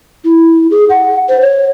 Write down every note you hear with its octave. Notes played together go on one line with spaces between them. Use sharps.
E4
G#4
F#5
C5
C#5